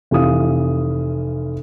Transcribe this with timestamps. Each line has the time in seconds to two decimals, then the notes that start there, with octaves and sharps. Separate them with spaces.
0.11 F1 E3 G4 F5 D#6